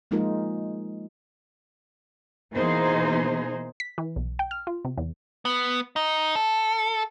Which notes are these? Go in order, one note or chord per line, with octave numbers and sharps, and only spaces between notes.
F3 G#3 A#3 D#4 F4 A#4
B2 E3 A#3 D#4 G#4 C5
B6
E3
B1
G5
F6
F4
C3
E2
B3
D#4
A4